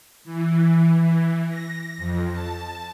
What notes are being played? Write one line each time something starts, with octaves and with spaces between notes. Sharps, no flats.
E3
E3
A#6
F2
A5